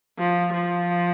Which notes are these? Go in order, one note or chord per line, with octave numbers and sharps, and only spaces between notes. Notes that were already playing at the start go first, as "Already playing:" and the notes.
F3
F3